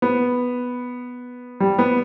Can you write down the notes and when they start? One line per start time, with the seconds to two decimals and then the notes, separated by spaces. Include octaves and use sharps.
0.02 B3
1.60 G3
1.79 B3